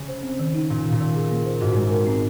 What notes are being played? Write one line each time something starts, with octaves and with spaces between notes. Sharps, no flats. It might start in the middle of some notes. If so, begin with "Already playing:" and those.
Already playing: C#3
C5
C4
D#3
D#4
A#2 D#4
D#3
A#2
D#3
G#4
A#3
C5
G#2 F#4
G#3
A#4
C4